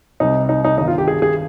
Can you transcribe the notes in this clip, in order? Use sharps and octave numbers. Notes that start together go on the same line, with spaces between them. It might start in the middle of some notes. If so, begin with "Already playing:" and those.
C2 C3 G3 C4 D#4
D#4
D#4
G1 G2 D#3 D#4
F4
G4
G#4
G#4